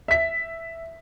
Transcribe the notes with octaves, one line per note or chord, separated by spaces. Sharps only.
E5 B6